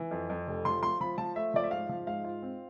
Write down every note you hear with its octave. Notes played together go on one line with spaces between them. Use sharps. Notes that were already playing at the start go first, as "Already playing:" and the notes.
Already playing: E3
F2
F2
F1
F3 C6
F3 C6
F3 B5
F3 A5
A3 E5
F3 D5
E5
G#2 F5
F3
G#2 F5
F4
C4